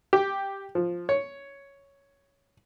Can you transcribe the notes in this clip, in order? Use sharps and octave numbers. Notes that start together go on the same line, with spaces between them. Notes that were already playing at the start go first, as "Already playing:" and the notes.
G4
F3
C#5